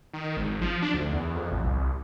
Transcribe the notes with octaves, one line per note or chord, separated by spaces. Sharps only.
D#3
G#1
F3
D4
D2
E2
F2
A1
C2